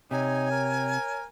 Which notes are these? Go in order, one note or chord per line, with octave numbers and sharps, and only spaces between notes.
C3 D#4 C#5 G#5
A#4